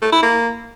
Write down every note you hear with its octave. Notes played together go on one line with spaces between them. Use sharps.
A3
E4
A#3